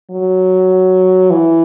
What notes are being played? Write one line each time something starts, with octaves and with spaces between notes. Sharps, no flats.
F#3
E3